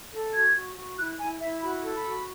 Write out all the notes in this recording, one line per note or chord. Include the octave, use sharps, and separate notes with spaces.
A4
F#4 G#6
F#4
F#4
E4 F#6
E4 G#5
E4 E5
F#4 B5
A4
B5
F#4